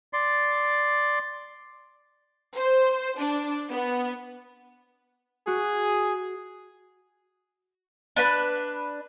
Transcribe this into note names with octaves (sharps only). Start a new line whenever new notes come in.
D5 C6
C5
D4
B3
F#4 G#4
D4 B4 B5